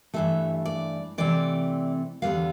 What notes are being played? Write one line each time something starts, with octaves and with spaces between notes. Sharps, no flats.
G2 E3 A3 E5
D5
C3 E3 A3 C4 D5
E2 D3 G3 B3 F5